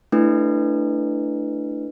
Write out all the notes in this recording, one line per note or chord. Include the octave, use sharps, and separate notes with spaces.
A3 D4 E4 B4